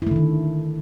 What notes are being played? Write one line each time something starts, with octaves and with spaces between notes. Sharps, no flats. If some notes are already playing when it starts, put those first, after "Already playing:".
D3 D#3 A3 E4